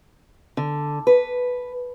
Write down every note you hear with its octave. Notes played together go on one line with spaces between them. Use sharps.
D3
B4